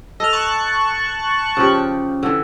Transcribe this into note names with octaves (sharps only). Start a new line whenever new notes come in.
A4 D#5 F6
A5 C#6 F#6
C#3 F3 G4
D3 E3